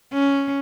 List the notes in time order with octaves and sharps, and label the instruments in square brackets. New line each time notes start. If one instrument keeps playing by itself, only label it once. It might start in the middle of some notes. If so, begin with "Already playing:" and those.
[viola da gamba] C#4